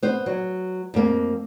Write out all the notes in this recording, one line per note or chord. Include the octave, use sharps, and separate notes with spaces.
B3 C5
F#3
F2 A#3